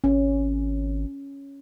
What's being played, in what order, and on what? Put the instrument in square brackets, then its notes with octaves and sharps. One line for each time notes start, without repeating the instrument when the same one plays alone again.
[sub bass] G#1 [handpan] C#4